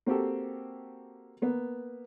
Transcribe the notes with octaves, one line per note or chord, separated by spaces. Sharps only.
A#3 C4 F#4 G4 A4
A#3 B3